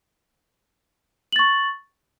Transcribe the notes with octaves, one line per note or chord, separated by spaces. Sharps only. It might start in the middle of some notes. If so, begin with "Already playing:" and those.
C#6 A6 F#7